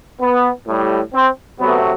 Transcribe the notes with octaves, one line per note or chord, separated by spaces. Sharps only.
B3
A2 G3
C4
C3 F#3 A3 B3